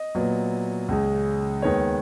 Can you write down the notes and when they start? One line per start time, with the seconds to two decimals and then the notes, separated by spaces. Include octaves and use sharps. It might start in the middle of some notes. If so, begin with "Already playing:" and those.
Already playing: D#5
0.15 A#2 F#3 B3
0.88 C#2 C#3 G#3
1.62 D#2 D#3 G#3 B3 C#5